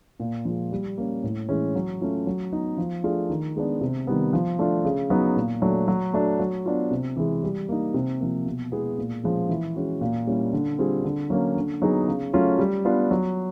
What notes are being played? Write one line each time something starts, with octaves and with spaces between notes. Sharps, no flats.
A#2
F3 G#3
G3
A#3 C#4
A2
E3 G#3 C#4 E4
F#3
A3 C#4 F4
F#3
B3 D#4
F3
A3 D4 F4 G#4
D#3
G#3 B3 D4
C3
D#3 G3 B3
F3
A3 D4 F4
C#3
F#3 B3 D#4
A#2
F#3 A3 D4
F#3
A3 D4 F#4
F#3
B3 D4 F4
C3
E3 G#3
G3
A#3 D#4
C3
F3 A#3
B2
G#3 B3 E4 G#4
A#2
F3 G#3 C#4
E3
G#3 C#4 F#4
A#2
G3 A#3 C#4 E4
D3
G3 C4 F4 G#4
D3
F#3 A#3 C#4
D3
F#3 B3 D#4 G#4
C#3
F#3 A3 C#4 F4
G3
B3 D4 F4
F#3